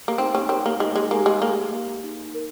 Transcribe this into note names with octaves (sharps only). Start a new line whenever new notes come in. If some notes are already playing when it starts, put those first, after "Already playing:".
A#3
C4 D#4
C#4
C4 A#4 C#5 G5 C6
A#3
G#3 D#4
G#3
A#3 G4 A#4 F5 G#5
G#3
A#3 G4
A#4 F5
D#4
A#4